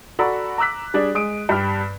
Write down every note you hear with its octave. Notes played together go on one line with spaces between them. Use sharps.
F#4 A4 D5 A#5 B5 E6
A#5 D6 E6 F#6 B6
G3 D4 G#4 D5
G#3 D#6 D7
G2 G4 B5 F6